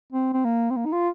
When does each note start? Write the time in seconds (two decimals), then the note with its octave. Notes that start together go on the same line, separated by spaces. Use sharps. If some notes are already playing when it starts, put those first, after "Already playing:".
0.13 C4
0.33 C4
0.45 A#3
0.71 C4
0.76 A#3
0.86 D#4
0.92 F4